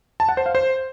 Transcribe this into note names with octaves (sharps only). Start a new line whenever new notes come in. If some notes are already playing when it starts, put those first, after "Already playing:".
A5
F#5
C5
F5
C5